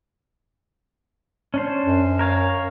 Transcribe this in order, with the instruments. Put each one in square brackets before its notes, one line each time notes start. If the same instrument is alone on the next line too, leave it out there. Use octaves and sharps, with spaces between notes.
[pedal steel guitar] C#4 D4 C5
[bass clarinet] F#2
[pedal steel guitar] A#4 C#5 F5